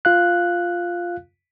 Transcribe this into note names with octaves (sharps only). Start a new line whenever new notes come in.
F4 F5 F#6